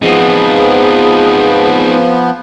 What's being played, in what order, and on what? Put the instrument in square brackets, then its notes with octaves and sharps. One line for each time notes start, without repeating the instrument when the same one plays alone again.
[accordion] F3 B3 [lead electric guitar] C4 D#4 [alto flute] G#4